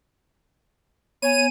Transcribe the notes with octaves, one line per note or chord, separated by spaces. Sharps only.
B3 C#5 G#5 D#7